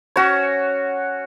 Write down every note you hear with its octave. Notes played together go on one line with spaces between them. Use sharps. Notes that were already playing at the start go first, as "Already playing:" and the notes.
C#4 F#4 C#5